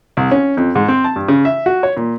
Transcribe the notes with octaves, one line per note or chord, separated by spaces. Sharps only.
C2
C#4
F2
G#2
C4
A5
G2
C#3
E5
F#4
C#5
A#2